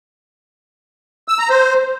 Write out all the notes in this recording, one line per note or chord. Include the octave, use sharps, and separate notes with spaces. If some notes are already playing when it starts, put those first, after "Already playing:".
E6
A#5
C5